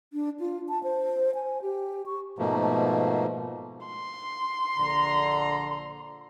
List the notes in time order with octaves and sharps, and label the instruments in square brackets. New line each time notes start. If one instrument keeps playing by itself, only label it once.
[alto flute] D4
F4
A5
C5
G#5
G4
C#6
[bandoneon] G#2 B2 F3 A3 A#3
[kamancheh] C6
[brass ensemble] A#1 D3 A#5